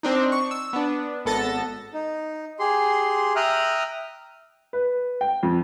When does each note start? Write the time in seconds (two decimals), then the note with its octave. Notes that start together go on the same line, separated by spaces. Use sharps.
0.03 C4 D4 D#4
0.32 C#6
0.51 E6
0.73 B3 D4
1.25 G#1 B3 A4 A6 A#6
1.93 D#4
2.59 G4 G#4 C6
3.36 E5 G5 A#5 D#6 F6 F#6
4.73 B4
5.21 G5
5.43 F2